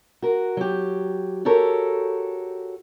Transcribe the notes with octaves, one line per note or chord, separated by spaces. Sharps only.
F#4 A#4
F#3 G4
F#4 G4 A4 A#4 C#5